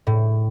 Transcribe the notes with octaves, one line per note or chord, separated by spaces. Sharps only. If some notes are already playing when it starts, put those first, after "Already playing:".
A2